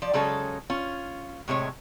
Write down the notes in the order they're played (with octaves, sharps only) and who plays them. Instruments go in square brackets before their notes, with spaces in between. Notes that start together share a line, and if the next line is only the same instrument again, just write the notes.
[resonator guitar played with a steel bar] F3 D5
C#3 F#3 G#3 C#4 G#4 A4
C#4 F4
A2 C3 G#3 C#5